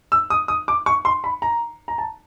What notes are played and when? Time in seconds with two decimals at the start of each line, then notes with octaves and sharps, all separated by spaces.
0.12 E6
0.30 D#6
0.48 D#6
0.68 D6
0.86 C#6
1.05 C6
1.24 B5
1.42 A#5
1.88 A#5
1.98 A5